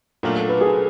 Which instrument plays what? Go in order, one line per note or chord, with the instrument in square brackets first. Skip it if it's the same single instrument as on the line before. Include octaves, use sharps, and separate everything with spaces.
[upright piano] A#2 F#3 A3 D4 F4 [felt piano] A#4
[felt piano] A4
B4
G#4